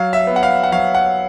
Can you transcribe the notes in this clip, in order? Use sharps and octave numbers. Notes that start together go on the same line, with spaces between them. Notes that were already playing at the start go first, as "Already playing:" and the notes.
Already playing: F#3 F5
E5
B3
F#5
F5
F#5
F#3 F5
F#5